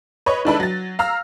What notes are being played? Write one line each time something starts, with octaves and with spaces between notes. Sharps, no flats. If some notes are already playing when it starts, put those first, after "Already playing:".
B4 C#5 D#5 C#6
D#3 G#3 D4 E4 A4 B4
F#3 A6
F5 A#5 E6 F6